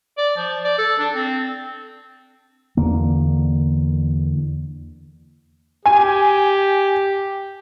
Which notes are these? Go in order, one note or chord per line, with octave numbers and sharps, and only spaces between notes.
D5
F3
D5
A4
D4
C4
E2 D3 A#3
G4 G#5